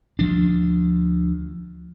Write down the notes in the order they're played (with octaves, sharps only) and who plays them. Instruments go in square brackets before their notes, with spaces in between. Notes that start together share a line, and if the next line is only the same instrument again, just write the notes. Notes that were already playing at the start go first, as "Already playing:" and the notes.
[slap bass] D2 F3 D4